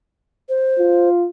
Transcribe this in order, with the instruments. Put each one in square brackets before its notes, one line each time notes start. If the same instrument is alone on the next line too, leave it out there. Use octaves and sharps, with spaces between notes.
[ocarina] C5
[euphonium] F4